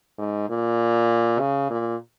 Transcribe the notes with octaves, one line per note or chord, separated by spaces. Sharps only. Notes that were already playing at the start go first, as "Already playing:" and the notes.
G#2
A#2
C#3
A#2